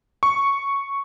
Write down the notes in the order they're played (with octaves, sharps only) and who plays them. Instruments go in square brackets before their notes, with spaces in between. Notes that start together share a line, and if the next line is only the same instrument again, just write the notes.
[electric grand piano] C#6